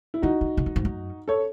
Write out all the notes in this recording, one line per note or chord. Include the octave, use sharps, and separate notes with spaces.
E4
D#3 D#4 F#4
D#3
C#3
E3
G#2
F#2
A4 C#5